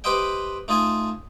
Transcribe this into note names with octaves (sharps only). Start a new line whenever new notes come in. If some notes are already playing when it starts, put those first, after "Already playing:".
G4 B4 C5 D#5 E5 G5
A3 D#4 F4 D#5 G#5 A5